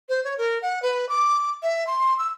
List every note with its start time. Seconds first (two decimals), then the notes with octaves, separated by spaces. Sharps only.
0.09 C5
0.24 C#5
0.38 A#4
0.62 F#5
0.82 B4
1.09 D6
1.63 E5
1.87 C6
2.18 E6